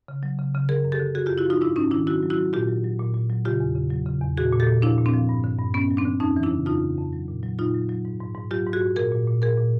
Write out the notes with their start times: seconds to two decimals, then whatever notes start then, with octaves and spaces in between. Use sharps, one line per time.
0.08 C#3
0.23 F#3
0.39 C#3
0.55 C#3
0.69 D3 G#4 A#4
0.85 F#2
0.92 G4 A4
1.00 D3
1.15 D3 F#4 G#4
1.26 F4 G4
1.30 F#2
1.38 E4 F#4
1.46 F3 D#4 F4
1.61 G#2 D4 E4
1.76 G#2 C#4 D#4
1.91 D#3 D4 E4
2.07 F#3 E4 F#4
2.22 F#3
2.30 E4 F#4
2.37 F#3
2.53 A#2 F4 G4
2.68 F#3
2.84 F#3
2.99 A#2
3.14 A#2
3.30 F#3
3.45 C#3 F4 G4
3.60 E2
3.75 C#3
3.91 F#3
4.06 C#3
4.21 E2
4.38 A#2 F#4 G#4
4.52 A#2
4.60 G4 A4
4.67 A#2
4.82 F3 D4 E4
4.98 A#2
5.06 C4 D4
5.14 F3
5.29 G2
5.44 D3
5.59 G2
5.74 G2 B3 C#4
5.90 F#3
5.97 C4 D4
6.05 D3
6.20 F2 C#4 D#4
6.36 E3
6.43 D4 E4
6.51 C#3
6.66 F2 D#4 F4
6.82 C#3
6.97 F2
7.13 F#3
7.28 A#2
7.43 F#3
7.59 A#2 D#4 F4
7.74 F#3
7.89 F#3
8.05 G#2
8.20 G#2
8.35 G#2
8.51 F#3 F4 G4
8.66 G#2
8.73 F#4 G#4
8.81 G#2
8.96 A#2 G#4 A#4
9.12 A#2
9.27 A#2
9.42 A#2 G#4 A#4
9.58 A#2